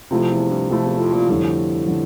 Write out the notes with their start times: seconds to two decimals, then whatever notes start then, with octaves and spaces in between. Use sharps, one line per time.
0.11 F2 C3 F3 A3 E4
0.31 E2
0.50 G2
0.70 F2 C3 F3 A3 E4
0.85 E2
0.99 F2
1.14 A#2
1.29 F2 A2 D3 G3
1.88 D3 G3